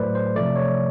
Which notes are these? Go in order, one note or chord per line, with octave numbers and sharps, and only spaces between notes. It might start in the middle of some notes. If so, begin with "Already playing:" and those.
Already playing: A2 F#3 A3 B4 C5 D5
C5
C3 F3 A3 D5
C#5